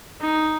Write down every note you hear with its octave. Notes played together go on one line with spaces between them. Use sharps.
D#4